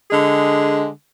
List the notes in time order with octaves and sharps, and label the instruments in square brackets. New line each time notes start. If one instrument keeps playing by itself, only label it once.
[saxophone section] D3 G#3 G#4